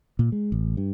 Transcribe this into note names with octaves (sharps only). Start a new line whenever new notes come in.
A#2
G#3
A1
G2